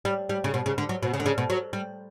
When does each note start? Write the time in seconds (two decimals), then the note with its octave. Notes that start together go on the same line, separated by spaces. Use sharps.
0.05 G3
0.29 G3
0.44 C#3
0.54 B2
0.66 C#3
0.78 D3
0.89 F#3
1.03 B2
1.14 C#3
1.20 D3
1.26 C#3
1.38 B2
1.50 F#3
1.73 G3